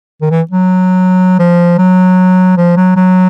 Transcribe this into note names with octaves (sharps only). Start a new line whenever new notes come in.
D#3
E3
F#3
F3
F#3
F3
F#3
F#3